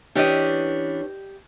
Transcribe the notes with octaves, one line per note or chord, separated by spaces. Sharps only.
E3 C#4 D4 G4 D5 D#5